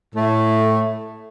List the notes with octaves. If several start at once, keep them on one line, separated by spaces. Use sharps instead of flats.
A2 A3